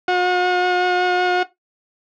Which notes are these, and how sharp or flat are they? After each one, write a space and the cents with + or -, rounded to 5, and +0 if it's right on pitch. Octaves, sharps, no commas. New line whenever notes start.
F#4 -45